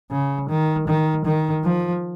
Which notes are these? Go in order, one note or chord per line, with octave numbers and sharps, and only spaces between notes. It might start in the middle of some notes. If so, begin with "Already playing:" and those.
C#3
D#3
D#3
D#3
F3